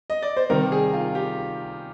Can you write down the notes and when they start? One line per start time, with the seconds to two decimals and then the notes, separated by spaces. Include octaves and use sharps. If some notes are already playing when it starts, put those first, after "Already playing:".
0.10 D#5
0.22 D5
0.37 C5
0.50 C3 D#3 G3 A#4
0.72 G#4
0.94 F4
1.15 G4